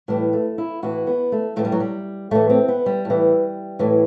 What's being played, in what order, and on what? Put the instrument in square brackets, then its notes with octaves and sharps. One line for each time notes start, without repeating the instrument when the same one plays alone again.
[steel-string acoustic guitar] A2 E3 G3
A3
E4
A2 E3 F#4
B3
A3
A2 E3 A3
G3
F#3
G3
A2 E3 A3
C4
B3
G3
A2 E3
A2 E3